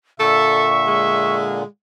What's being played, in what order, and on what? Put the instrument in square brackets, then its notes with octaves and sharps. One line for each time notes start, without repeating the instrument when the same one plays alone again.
[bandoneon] A#2 D3 [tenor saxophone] A4 [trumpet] E5 [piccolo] C#6
[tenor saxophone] G#3